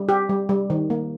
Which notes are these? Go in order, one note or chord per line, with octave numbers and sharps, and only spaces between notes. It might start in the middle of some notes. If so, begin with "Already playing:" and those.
Already playing: G3
G4
G3
G3
D#3
A#3